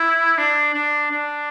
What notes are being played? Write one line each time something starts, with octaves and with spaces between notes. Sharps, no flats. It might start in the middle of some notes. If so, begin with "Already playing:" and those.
Already playing: E4
D4
D4
D4